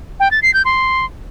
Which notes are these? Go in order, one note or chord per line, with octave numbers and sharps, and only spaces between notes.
G5
A6
C7
G6
C6